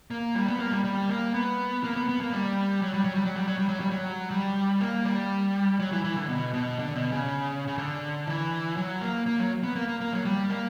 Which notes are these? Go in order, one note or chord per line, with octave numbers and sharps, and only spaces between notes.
A#3
G3
B3
A#3
G3
G3
A#3
B3
A#3
B3
B3
A#3
G3
F#3
G3
F#3
G3
F#3
G3
F#3
G3
F#3
G3
F#3
G3
A#3
G3
F#3
E3
E3
D3
B2
B2
D3
B2
C#3
C#3
D3
E3
F#3
A#3
A#3
F#3
B3
A#3
A#3
A#3
F#3
G3
A#3